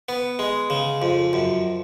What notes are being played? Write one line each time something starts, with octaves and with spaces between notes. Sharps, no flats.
B3
G#3
C#3
F2
F#2